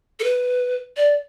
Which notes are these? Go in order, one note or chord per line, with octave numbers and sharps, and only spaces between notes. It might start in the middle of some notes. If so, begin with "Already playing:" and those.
A4
B4
D5